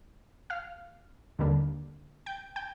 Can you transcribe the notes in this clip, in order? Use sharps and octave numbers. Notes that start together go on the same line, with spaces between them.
F5 F6
D#2 D3 G3 A#3 D4
G5 G6
G5 G6